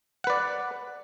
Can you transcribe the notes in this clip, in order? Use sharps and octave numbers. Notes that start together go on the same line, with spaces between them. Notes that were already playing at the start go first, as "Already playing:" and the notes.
B4 D5 F#5